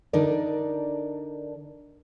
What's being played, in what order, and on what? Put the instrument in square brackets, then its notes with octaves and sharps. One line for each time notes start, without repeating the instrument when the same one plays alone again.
[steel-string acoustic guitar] D3 D4 D#4 A#4 D5